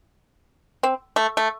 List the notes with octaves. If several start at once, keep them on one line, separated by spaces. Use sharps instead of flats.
C4
A3
A3